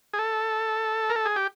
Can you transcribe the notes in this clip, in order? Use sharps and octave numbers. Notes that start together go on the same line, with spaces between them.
G#4
A4
A#4
A4
G#4
G4